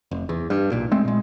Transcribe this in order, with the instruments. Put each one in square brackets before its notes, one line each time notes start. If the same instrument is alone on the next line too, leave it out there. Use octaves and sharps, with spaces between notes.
[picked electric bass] F1
E2
G2
B1 A#2
G#3 A3 C4
A#2 G#3